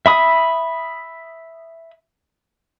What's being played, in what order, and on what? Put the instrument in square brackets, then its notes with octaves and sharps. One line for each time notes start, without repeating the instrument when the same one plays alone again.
[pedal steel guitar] E5 B5 D#6